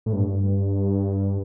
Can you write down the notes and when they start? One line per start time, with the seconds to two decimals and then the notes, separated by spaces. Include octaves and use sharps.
0.06 A2
0.13 G2